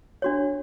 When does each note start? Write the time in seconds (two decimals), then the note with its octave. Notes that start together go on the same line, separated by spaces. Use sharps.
0.22 D4 F#4 C#5